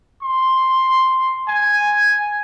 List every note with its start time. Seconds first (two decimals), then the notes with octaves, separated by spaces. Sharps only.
0.23 C6
1.48 G#5